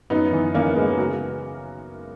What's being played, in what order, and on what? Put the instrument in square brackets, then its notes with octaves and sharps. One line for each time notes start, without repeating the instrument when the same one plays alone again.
[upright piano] F#2 B3 D#4
E3
E3 A#3 C#4
C#3 G#3 B3
F#4 A#4